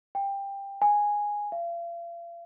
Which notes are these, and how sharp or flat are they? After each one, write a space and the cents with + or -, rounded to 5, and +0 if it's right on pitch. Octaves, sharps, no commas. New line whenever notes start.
G5 +15
G#5 -5
F5 -40